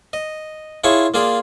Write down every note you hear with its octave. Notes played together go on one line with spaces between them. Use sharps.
D#5
E4 F4 G#4 C#5 A5 C#6
A#3 F4 G#4 D5